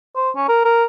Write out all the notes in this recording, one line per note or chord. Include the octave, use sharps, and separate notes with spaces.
C5
C#4
A#4
A#4